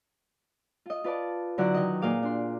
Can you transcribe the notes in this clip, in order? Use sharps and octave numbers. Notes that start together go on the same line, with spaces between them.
F4 D#5
F4 B4 D5 A5
D3 F#3 E4 D5 F#5 C#6
D#3 D#5
A#2 F4 G#4 F5 D6
D4 C6